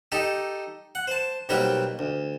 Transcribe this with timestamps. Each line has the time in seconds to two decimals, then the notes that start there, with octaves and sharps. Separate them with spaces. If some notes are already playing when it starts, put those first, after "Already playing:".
0.12 D#4 G4 A4
0.95 F#5
1.08 C5 A5
1.49 B1 G3 A#3 C4 F#4 G4
1.99 D2